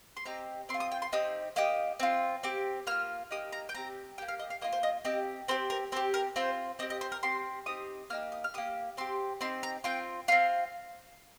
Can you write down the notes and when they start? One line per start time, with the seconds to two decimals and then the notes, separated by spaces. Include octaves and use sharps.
0.17 C6
0.25 C4 D#4 G4 A#5
0.69 C4 C6
0.74 F4
0.80 D#6
0.91 G5
1.02 C6
1.13 C4 D#4 G4 D#6
1.56 A#3 D#4 G4 D#6
2.00 C4 F4
2.43 C4 G4
2.87 A#3 F4 F6
3.31 A#3 D#4 G4 D#6
3.53 A#5
3.69 G5
3.74 C4 G4 A#5
4.18 A#3 G4 G5
4.28 F5
4.39 D#5
4.50 F5
4.61 A#3 F4 D#5
4.72 C5
4.83 D#5
5.05 C4 G4 D#5
5.48 C4 G4 C5
5.70 A#4
5.92 C4 C5
5.96 G4
6.14 A#4
6.36 C4 F4 C5
6.79 C4 D#5
6.82 G4
6.90 D#5
7.01 C5
7.12 A#4
7.23 C4 G4 C6
7.66 C4 D#4 G4 D#6
8.10 A#3 D#4 G4 F6
8.32 D#6
8.44 F6
8.54 A#3 G4 D#6
8.97 C4 G4 C6
9.41 C4 D#4 G4 C6
9.63 A#5
9.84 C4 F4 G5
10.28 F4 F5
10.32 C4